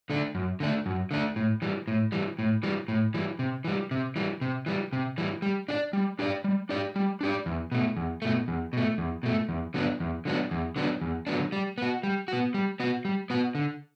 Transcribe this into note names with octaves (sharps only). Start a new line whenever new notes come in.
D3 A3 D4
F#2
D3 A3 D4
F#2
D3 A3 D4
A2
E3 G3
A2
E3 G3
A2
E3 G3
A2
E3 G3
C3
E3 G3
C3
E3 G3
C3
E3 G3
C3
E3 G3
G3
D4 G4 D5
G3
D4 G4 D5
G3
D4 G4 D5
G3
D4 G4 D5
E2
B2 A3
E2
B2 A3
E2
B2 A3
E2
B2 A3
E2
D3 F#3 B3 D4
E2
D3 F#3 B3 D4
E2
D3 F#3 B3 D4
E2
D3 F#3 B3 D4
G3
B3 F#4
G3
B3 F#4
G3
B3 F#4
G3
B3 F#4
D3